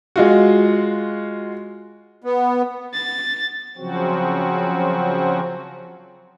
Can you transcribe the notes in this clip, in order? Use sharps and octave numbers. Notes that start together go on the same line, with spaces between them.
G#3 F4 F#4
B3
A6
C#3 F3 F#3 C4 F#4